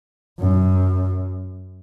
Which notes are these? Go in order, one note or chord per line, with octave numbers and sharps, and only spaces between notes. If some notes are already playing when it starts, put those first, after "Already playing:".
F#2